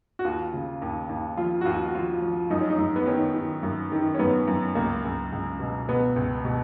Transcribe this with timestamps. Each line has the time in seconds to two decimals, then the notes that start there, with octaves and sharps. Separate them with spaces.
0.19 F#4
0.25 D#2 F4
0.54 C#3
0.82 D#2
1.09 D#2
1.37 F3 F4
1.61 F#4
1.65 D#2 F4
1.88 F#4
1.95 F3 F4
2.22 F3
2.50 F#2 D#4
2.61 C#4
2.70 D#4
2.78 F#2
2.96 B3
3.06 D#3 C#4
3.35 D#3
3.63 F#2
3.92 D#3
4.14 C#4
4.19 F#2 B3
4.47 F#2
4.75 C#2 A#3
5.04 C#2
5.32 C#2
5.59 B2
5.89 B2 B3
6.16 C#2
6.45 B2